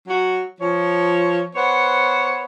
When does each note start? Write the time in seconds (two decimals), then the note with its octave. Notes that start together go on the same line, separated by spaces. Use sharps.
0.07 F#3 F#4
0.60 F3 C#5
1.55 B3 C5 C#5 F#5